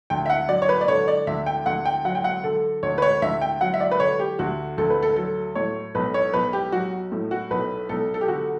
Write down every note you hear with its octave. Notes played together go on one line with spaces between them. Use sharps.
D2 G5
E5
F#5
F#3 D5
C#5
B4
D5
D3 C#5
D5
D2 E5
G5
D2 F#5
G5
F#3 F#5
G5
F#5
D3 A4
D2 C#5
B4
C#5
D2 E5
G5
F#3 F#5
E5
D5
B4
D3 C#5
G4
D2 F#4
D2 A4
B4
A4
F#3 A4
A2 C#5
B1 B4
C#5
B1 B4
G4
F#3 F#4
A2
F#4
B1 B4
B1 A4
A4
G4
D3 F#4